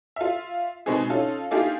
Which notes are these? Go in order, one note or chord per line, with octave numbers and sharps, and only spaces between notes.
F4 E5
B2 G#3 C4 D4 D#4 G#4
C#4 D#4 F4 A4
A#3 D4 D#4 F4 G4 G#4